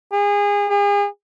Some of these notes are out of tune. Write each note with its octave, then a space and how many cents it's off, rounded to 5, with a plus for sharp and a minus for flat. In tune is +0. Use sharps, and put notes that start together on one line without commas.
G#4 -30
G#4 -40